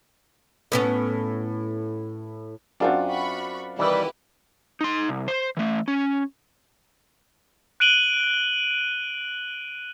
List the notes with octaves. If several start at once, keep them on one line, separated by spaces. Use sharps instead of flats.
A2 B3 C#4
F#2 C4 D4 F4 F#4
B5 C#6
C3 D#3 E3 G3 E4 G4 B4
D#4 C6
C2
C5
E3 A3
C#4
F#6 D7 D#7 F#7 G7